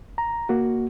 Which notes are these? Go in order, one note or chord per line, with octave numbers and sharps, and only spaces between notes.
A#5
A#3 F#4